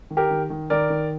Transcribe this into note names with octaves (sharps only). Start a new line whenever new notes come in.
D#3
G4 A#4
D#3
D#3
D#3 A#4 D5
D#3